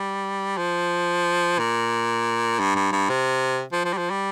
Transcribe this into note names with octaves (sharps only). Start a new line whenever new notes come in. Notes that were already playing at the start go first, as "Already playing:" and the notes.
Already playing: G3
F3
A#2
G2
G2
G2
C3
F3
F3
G3
F3
G3